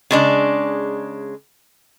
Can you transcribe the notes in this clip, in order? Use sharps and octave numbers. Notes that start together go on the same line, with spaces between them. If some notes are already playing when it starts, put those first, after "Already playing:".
C#3 G#3 D4